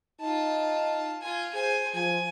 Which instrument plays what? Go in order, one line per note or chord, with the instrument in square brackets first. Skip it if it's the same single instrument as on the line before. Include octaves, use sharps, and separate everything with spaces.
[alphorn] D#4 [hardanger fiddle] F4 A5
[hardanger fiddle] F4 G#5
[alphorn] G#4 [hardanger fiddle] C5 G#5
[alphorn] F3 [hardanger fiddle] G#5